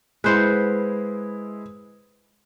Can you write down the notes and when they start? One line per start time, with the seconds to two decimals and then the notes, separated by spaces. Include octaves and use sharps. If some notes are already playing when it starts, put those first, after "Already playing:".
0.24 G#3 E4 B4 C5 F#5